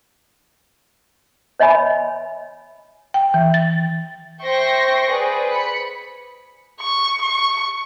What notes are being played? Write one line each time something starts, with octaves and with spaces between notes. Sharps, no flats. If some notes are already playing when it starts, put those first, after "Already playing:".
C#5 D#5 E5 G#5 B5
G5
E3
A6
C5 E5 G5 C6 C#6 A#6
G#4 B4 C5 D5
B5 C#7
C#6
C#6